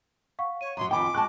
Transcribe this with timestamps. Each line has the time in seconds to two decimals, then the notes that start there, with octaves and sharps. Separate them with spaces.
0.39 F5 F#5 C#6
0.61 C#5 D#7
0.77 F#2 F#3 A#5 C6
0.91 F2 D#3 G5 G#5 B5 D6
1.15 G#3 G5 A5 C#6 F#6